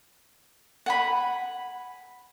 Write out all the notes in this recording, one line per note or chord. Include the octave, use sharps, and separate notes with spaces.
F#5 G#5 B5